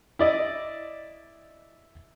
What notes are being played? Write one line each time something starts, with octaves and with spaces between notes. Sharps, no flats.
E4 D5 D#5